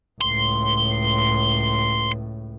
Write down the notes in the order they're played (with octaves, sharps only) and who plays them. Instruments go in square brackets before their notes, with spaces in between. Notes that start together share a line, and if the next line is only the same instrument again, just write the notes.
[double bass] C#2 A2 [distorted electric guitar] C6